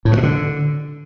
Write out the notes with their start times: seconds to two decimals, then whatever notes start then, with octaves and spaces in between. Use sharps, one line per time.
0.05 A2
0.11 G2
0.17 B2
0.23 D3